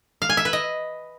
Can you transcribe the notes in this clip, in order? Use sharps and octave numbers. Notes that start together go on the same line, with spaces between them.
F5
G#5
E5
B4
D#5